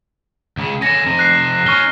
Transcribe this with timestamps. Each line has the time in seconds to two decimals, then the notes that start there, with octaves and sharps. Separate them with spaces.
0.57 C#2 C#3
0.82 D3 C#4 A#6 C#7 E7
1.04 F2 C3
1.19 F#6 C7
1.66 C#4 D#4 C#6 F6 G7